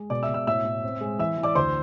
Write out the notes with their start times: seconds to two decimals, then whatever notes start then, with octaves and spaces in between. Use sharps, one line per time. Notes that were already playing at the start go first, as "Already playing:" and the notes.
Already playing: G#3
0.10 B2 D5 D6
0.23 E5 E6
0.29 B2
0.34 E5 E6
0.47 A2 E5 E6
0.65 A2
0.83 C4
1.01 G#3
1.19 E3 E5 E6
1.38 E3
1.43 D5 D6
1.55 D2 C5 C6